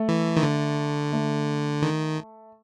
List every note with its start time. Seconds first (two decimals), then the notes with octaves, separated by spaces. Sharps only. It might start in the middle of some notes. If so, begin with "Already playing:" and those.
Already playing: A3
0.08 E3
0.37 D#3
0.43 D3
1.13 A3
1.82 D#3